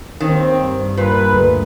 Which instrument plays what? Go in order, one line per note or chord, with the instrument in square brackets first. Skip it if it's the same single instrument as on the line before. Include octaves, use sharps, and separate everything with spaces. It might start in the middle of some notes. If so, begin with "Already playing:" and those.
[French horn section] D#2 C4 [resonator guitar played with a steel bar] D#3
[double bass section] G2
[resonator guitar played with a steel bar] A#2 [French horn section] D4 A#4 B4
[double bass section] D2 G2